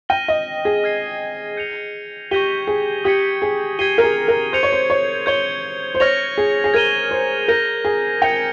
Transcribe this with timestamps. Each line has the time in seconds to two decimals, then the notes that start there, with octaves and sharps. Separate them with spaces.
0.09 G5 F6 A#6 D#7 G7
0.28 D#5
0.65 G#4
0.84 F6 G#6 C7
1.57 G6 C#7 F7
2.31 G4 C#6 G6 A#6 D#7 G7
2.67 G#4
3.04 G4 D#6 G#6 C#7
3.42 G#4
3.79 G4 G#6 C7 D#7 G7
3.98 A#4
4.03 G#4
4.28 A#4
4.53 C5 G6 C#7 F7
4.63 C#5
4.72 C5
4.90 C#5
5.26 C#5 G6 C#7 G7
5.95 C5
6.00 C#5 F6 A#6 F7
6.38 G#4
6.64 G#4
6.74 A#4 G#6 D#7 G7
7.11 C5
7.48 A#4 G6 A#6 D#7
7.85 G#4
8.22 G5 G6 C#7 F7